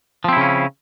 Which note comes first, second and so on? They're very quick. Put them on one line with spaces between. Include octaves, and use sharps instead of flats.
F3 C4 E4 C#3 C#4